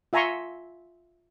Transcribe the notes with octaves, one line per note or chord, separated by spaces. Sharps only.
F4 E5 G#5 A#5 C6 C#6